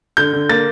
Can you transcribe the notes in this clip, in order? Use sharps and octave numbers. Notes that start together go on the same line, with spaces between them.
D3 G6
D3
A#3 A6